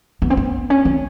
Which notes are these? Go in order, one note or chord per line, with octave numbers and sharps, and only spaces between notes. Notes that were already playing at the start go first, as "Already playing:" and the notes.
B3
C4
B3
C#4
C4